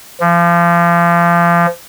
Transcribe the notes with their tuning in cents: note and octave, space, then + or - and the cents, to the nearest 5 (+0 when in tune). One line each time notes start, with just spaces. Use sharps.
F3 -30